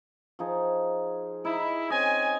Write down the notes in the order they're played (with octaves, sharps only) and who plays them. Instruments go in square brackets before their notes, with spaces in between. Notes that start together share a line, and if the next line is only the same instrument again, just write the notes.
[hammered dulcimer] F3 D#4 G#4
[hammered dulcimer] D#4 [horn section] E4
[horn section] C4 C#4 G#5 [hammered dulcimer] D#5